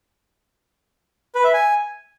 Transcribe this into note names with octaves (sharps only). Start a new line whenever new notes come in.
B4
E5
G#5